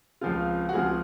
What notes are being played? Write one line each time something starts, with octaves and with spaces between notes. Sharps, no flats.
C#2 C#3 F3 C4 F4
F#4
C#2 C#3 F3 C4 F4 G#4